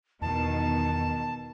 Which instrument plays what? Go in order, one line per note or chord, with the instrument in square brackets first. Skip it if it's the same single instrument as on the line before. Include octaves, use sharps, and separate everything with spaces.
[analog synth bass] E2 [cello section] B2 D#3 [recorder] A5